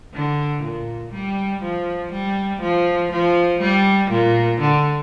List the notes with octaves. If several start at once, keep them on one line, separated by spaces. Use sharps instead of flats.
D3
A#2
G3
F3
G3
F3
F3
G3
A#2
D3